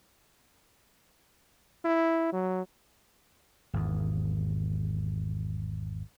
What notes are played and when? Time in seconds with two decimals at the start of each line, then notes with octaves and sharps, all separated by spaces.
1.85 E4
2.33 F#3
3.73 G#1 E2